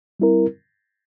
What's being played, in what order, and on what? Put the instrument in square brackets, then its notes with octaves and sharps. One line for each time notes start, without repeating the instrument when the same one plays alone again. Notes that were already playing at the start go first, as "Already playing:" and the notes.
[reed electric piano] G3 C4 E4 A#4